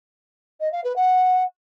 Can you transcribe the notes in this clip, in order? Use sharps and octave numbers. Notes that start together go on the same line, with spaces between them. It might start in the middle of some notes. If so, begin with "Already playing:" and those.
D#5
F5
B4
F#5